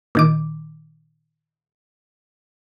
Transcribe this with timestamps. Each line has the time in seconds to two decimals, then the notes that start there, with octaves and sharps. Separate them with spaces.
0.15 A#2 D#3 D6